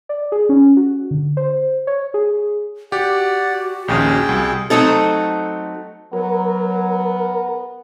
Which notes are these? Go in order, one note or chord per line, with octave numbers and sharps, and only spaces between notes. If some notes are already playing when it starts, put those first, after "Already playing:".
D5
G#4
C#4
F#4
D3
C5
C#5
G#4
F#4 G4 D5 F#5
A#1 D#2 C#4 G#4 G5
C2
F#3 A3 C4 D#4 A4
F#3 B3 A#4